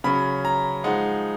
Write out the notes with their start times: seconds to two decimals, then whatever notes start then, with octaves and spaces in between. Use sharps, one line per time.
0.04 C#3 F#3 C#4 B5
0.45 A#5
0.84 F3 G#3 D#4 F#5